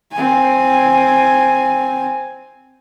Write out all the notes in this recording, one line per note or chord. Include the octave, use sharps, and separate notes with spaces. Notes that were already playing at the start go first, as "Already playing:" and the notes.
C4 G#5